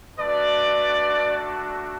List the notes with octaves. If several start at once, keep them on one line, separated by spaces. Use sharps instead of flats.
A3 D4 F#4 B4 D5